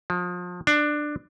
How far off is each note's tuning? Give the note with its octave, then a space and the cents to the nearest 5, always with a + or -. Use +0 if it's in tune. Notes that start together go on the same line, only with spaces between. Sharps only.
F3 +30
D4 +15